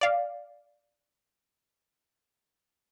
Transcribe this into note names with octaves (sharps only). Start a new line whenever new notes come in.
D5 F5